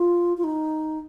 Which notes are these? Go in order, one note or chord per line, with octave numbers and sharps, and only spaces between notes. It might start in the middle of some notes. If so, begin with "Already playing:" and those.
Already playing: F4
F4
D#4